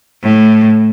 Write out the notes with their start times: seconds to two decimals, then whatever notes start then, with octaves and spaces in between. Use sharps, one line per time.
0.23 A2